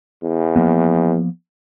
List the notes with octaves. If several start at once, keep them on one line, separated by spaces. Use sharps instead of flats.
E2
F3 A#3 B3